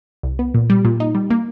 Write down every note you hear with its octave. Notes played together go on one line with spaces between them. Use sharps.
C2
B3
A#2
G3
A#2
D#4
G3
A#3